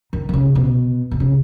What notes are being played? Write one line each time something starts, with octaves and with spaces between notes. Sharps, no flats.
D#3
D#3
C#3
B2
B2
C#3